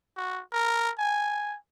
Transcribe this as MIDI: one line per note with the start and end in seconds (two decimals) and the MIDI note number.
0.17 0.41 66
0.53 0.91 70
0.99 1.56 80